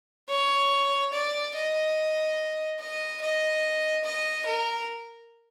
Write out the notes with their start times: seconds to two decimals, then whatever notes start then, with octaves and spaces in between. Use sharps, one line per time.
0.28 C#5
1.13 D5
1.54 D#5
2.80 D#5
3.21 D#5
4.04 D#5
4.46 A#4